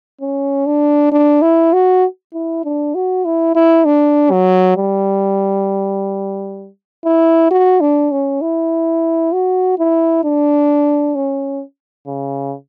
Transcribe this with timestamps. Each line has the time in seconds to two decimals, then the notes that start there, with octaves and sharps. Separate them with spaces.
0.21 C#4
0.66 D4
1.12 D4
1.42 E4
1.73 F#4
2.34 E4
2.65 D4
2.95 F#4
3.25 E4
3.55 E4
3.85 D4
4.31 F#3
4.77 G3
7.05 E4
7.51 F#4
7.81 D4
8.12 C#4
8.42 E4
9.33 F#4
9.79 E4
10.24 D4
11.15 C#4
12.07 C#3